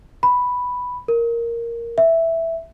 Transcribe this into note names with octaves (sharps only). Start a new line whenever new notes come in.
B5
A#4
E5